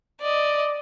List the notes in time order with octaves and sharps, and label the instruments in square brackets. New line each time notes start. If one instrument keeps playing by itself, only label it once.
[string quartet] D5 D#5